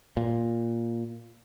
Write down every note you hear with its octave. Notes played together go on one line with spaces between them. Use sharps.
A#2